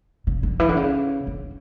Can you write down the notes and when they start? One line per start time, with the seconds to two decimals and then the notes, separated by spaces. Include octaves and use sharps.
0.27 C#3
0.43 D3
0.60 E3
0.69 D3
0.76 C#3
1.27 D3